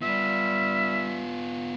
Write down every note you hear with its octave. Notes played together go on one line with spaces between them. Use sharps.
G3 B3 F4 E5